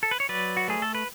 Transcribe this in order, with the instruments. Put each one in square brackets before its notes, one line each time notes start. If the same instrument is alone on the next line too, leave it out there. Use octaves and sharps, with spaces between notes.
[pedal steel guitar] A4
B4
C#5
F#3 B4 D5
F#4
A3 G#4
A4
B4